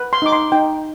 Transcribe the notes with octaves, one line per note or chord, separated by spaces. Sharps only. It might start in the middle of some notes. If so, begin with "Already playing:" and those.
Already playing: B4
C6
D#4 D6
C6
D#4 G5